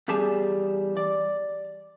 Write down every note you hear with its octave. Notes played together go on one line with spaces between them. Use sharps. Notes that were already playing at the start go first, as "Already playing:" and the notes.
E2 G3 G4 G#4 A5
D5